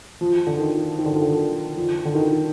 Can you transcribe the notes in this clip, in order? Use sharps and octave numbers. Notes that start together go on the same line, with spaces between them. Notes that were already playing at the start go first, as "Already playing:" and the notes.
F3
D3
D#3
D#3
D3
D3
F3
D3
D#3